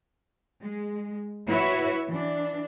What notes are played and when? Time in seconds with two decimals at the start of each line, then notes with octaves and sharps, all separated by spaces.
0.62 G#3
1.48 E4 F#4 B4 C#5 E5
2.09 E3 D4